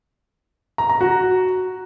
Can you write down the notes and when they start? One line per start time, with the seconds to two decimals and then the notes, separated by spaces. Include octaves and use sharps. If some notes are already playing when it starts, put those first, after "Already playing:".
0.78 A#5
0.89 A#5
1.01 F#4